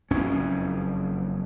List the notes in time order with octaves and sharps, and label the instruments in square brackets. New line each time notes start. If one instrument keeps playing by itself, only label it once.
[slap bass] F#1 F2 C#4